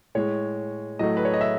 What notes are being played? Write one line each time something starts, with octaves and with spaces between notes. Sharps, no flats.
A2 G#3 C#5
A2 F#3 A3 D#5
B4
C#5
D#5
E5